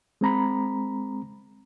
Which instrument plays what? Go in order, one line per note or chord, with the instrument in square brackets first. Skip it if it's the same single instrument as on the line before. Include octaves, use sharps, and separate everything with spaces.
[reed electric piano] G#3 C4 A#5 B5